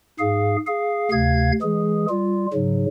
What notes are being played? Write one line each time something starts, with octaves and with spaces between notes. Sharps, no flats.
G#2 G#4 F5
G#4 F5
D2 C3 F5 G#6
E3 G#3 G#4
G3 F4
G#2 C#3 F#3